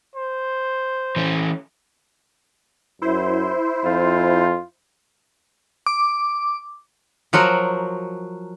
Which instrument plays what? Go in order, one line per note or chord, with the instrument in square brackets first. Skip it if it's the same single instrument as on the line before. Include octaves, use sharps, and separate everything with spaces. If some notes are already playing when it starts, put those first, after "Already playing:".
[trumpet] C5
[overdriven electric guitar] E3 C#4
[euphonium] F#2 [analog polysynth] E4 C5
[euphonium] F2 [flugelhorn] F4
[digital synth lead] D6
[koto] F3 F#3 F#4 A#4